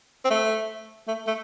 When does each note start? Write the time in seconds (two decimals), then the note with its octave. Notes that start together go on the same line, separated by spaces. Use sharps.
0.25 C4
0.30 A3
1.08 A3
1.27 A3